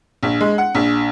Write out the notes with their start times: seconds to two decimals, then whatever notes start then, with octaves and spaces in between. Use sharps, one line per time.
0.23 A#1
0.41 G#3
0.58 F#5
0.75 A#1